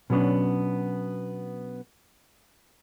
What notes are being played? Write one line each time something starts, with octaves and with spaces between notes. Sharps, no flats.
B2 F#3 G#3 B3 C#4 D4